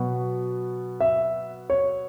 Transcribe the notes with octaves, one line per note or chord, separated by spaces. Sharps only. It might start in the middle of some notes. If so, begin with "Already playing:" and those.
Already playing: B2 F#3 B3
E5
C#5